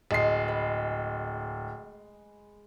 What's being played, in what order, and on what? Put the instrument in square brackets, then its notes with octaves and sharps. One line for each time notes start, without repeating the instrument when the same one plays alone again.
[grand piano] D1 C7 [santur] G#3
[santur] B5